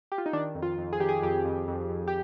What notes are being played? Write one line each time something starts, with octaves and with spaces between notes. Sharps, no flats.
G4
F4
D#4
D#3 D4
F2
F4
F2
G#4
D#3 G4
G#4
F2 G4
F2
F2
F2
G4